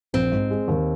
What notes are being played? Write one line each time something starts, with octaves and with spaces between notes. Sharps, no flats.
A#1 C4
G#2
G#3
D#2